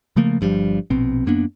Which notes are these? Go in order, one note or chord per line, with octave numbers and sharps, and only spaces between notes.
C#3 F3 A3 A#3
G1 G2 F3 G3
A#1 B2 C4
F#2 A#3 B3 D4